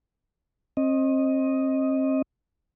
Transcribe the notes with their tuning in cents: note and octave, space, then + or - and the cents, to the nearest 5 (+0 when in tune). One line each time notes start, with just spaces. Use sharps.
C4 +35 D#5 +0